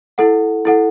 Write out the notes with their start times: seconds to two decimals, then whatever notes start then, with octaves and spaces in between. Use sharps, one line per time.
0.18 E4 A4 F#5
0.65 E4 A4 F#5